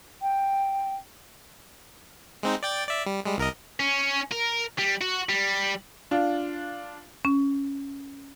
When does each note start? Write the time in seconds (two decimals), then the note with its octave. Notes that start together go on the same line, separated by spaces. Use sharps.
0.22 G5
2.43 G#3 C4 D#4
2.63 D5 G5 A6
2.88 D5 E5
3.06 G3
3.25 G3 G#3
3.38 C2 A#4 D#5
3.80 C#4
4.32 A#4
4.79 G3
5.01 F#4
5.29 G3
6.11 D4 F4
7.25 C#4